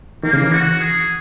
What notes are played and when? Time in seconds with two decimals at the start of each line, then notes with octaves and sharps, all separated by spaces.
0.23 D#3 A#3
0.33 C#3
0.42 E3
0.52 F#4
0.80 G#4